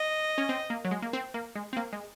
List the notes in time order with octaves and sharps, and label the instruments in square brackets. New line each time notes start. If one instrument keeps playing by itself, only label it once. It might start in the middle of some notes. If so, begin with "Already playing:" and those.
Already playing: [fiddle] D#5
[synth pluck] C#4
C4
A#3
F#3
G#3
A#3
C4
A#3
G#3
C4
A#3
G#3